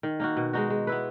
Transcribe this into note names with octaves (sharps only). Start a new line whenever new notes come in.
D#3
A#3 D#4 F#4
B2
G#3 D#4 F#4
G#3
B3 E4 B4